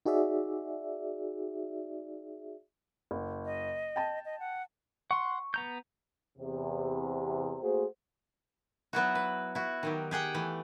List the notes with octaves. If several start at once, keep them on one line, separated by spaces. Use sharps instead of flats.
D#4 F#4 G#4 D5 E5
F#1
D#5
G5 A5
D#5
F#5
F#5 C6 C#6
B3 A#5 G6
E2 C3
A3 A#3 F#4 G#4 C5
F#3 B3 E4 F#4
B4
E4 F#4
D#3 F#3 G4
G4 G#4 F#5 G5
E3 A3